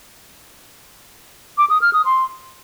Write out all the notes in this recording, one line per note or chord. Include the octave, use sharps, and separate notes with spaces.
D6
D#6
F6
D#6
C6